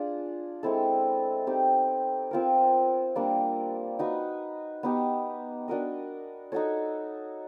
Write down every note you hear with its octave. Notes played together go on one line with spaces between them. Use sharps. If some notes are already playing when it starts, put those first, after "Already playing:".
Already playing: D4 F4 G#4
G#3 C4 E4 A4
C4 D#4 G4
C4 F4 A#4
G3 A#3 D4
D#4 F#4 B4
B3 D#4 G4
D4 F#4 A#4 D#5
D#4 F#4 A4 C#5